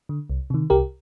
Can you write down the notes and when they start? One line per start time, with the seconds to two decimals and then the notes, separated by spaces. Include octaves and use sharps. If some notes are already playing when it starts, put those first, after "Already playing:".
0.09 D3
0.30 C2
0.50 C3 D#3
0.70 C2 G4 A#4